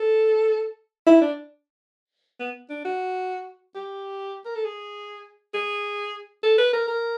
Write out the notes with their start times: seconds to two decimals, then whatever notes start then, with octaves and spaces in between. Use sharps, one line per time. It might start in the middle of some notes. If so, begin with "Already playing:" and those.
Already playing: A4
1.06 E4
1.21 D4
2.40 B3
2.70 D4
2.85 F#4
3.75 G4
4.45 A#4
4.55 A4
4.65 G#4
5.54 G#4
6.43 A4
6.58 B4
6.73 A#4
6.88 A#4